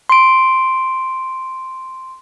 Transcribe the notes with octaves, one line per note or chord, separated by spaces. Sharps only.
C6 D7